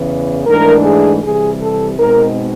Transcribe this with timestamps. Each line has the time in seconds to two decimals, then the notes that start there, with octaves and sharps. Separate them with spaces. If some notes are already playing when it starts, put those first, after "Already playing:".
Already playing: E2 C#3 E3
0.46 G#2 E3 A3 D4 A#4
0.84 G#4
1.22 C3 E3 G3 G#4
1.59 A4
1.97 B2 G#3 C4 D#4 A#4